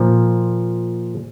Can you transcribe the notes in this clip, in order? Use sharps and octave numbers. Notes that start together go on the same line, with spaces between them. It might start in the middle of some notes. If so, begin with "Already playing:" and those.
Already playing: A#2 F3